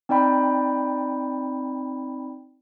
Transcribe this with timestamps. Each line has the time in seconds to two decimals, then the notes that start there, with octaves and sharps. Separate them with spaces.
0.09 C4 D#4 D5 G5 B5